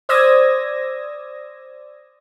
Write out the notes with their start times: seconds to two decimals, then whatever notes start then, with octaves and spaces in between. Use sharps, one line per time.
0.09 C5 D5 D#6 E6 G#6 A#6